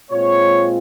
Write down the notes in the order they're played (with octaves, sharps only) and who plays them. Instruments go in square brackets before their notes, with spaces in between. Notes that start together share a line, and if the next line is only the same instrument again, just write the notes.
[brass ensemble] A#2 G#3 C4 F4 [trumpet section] C#5